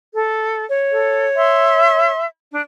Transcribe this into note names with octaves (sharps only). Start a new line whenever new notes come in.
A4
C#5
A4
E5 C6
D4